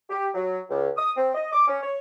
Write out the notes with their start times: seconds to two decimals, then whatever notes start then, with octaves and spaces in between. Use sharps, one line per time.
0.10 G4
0.35 F#3
0.69 C#2
0.97 D#6
1.17 C4
1.35 D#5
1.53 D6
1.67 C#4
1.82 C#5